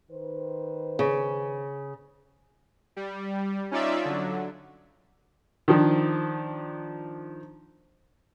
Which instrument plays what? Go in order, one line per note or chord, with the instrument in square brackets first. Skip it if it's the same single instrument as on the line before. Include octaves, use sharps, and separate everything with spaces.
[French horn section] D#3 B4 C5
[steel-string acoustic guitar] C#3
[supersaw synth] G3
C#4 D#4 F4 D5 E5
D3 F#3
[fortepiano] D#3 F3 D4